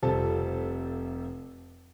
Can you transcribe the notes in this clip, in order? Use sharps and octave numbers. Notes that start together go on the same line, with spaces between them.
F1 C3 F3 G3 A4 A5